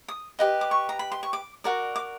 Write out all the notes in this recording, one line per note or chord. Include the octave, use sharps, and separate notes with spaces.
D#6
G4 B4 D#5
D6
C#6
A#5
B5
C6
C#6
D6
F#4 A#4 D5
D6